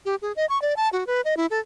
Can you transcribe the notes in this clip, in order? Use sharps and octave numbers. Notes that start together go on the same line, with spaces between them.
G4
G#4
D#5
C#6
D5
A5
F#4
B4
D#5
E4
A4